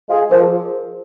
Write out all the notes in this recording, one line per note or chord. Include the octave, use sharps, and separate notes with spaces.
G#3 F4 G#4
F3 A#4
G#4